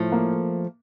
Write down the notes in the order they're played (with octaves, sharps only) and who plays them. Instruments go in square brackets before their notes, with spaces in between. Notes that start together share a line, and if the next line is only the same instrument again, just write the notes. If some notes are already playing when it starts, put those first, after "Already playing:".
Already playing: [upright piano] A2 [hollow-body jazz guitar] F3 A3
[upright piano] A#3